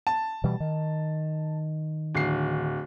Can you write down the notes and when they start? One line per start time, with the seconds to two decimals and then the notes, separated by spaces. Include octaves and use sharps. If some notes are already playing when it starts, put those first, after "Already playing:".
0.07 A5
0.44 B2 E3 G3
0.60 D#3
2.15 D1 C7